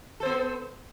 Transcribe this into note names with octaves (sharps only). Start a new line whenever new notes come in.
B3 A4 C5